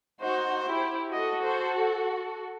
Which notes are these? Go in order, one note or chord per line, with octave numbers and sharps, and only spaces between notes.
D#4 F#4 C5
E4 G4
F#4 A4 D#5
C5